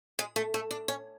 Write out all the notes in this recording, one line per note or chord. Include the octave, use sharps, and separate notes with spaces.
G#3
A3
A3
D4
C#4